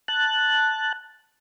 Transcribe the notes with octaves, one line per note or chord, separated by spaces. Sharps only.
A5 F#6